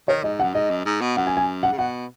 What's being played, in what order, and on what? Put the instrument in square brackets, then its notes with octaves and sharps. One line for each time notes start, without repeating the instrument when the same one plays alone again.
[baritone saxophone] D#3 [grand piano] C#5
[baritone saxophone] G#2 [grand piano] D#5
[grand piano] F#5
[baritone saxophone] F#2
[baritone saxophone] G#2 [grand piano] D#5
[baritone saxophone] F#2
G#2
B2
[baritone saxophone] F#2 [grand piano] F#5
[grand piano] G#5
G#5
F#5
[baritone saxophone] C#3
[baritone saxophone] B2 [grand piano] F#5